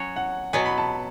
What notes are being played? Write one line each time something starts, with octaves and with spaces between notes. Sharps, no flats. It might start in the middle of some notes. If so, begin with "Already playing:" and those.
Already playing: F#3 C#4 F#4 C#5
F#5
B2 F#3 B3 G#5
B5
A5